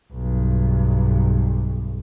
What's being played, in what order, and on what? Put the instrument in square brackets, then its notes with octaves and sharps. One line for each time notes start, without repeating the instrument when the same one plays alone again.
[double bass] B1 G2